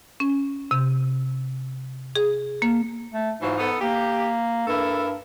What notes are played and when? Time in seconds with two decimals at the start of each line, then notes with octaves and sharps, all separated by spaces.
0.20 C#4
0.71 C3
2.15 G#4
2.62 A#3
3.14 A3
3.42 G#2 E3 F#3 F4
3.58 B3 D#4 A4
3.81 A#3 G4
4.67 G2 E4 A4 A#4